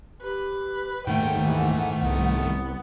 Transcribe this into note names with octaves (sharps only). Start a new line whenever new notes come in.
G4 B4
D#2 G#2 D#3 A3 F#5 G5
E3
C2 B3